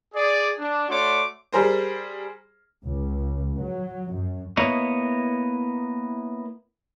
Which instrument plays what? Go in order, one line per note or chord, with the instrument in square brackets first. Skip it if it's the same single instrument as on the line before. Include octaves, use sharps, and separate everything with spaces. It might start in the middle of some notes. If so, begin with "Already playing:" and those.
[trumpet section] G#4 D5
D4
A3 F#4 C#5 D5 C6 D6
[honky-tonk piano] G3 G#4 A#4 C5
[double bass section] C#2
F#3
F#2
[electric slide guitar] A#3 B3 E4 C#5 D#5